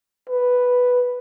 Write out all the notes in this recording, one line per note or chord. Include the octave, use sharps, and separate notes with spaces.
B4